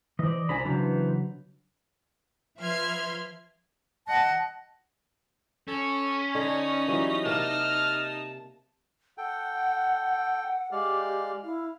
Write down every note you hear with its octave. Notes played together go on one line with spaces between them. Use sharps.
E3 C5 D5 D#5
C2 D4 C5 G#5 A#5 B5
C#3 E3 F#3 B3 D4 C5
F3 B4 E5 C6 F6 G#6
D#5 F#5 A5
C#4 A4
D3 D#4
E3 F#3 G3
C3 A#3 A5 F6
A4 F#5 G5
G#3 G4 D5 F5
E4 F5